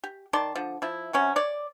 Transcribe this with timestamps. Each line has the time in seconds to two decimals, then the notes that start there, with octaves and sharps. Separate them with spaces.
0.04 G4
0.33 D#3 D5 A5 C6
0.55 D3 F3
0.82 F3 E4
1.13 C3 F#3 C#4
1.36 C#5 D5